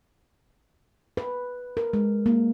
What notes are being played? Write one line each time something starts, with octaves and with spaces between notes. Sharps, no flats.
B4
A#4
G#3
A#3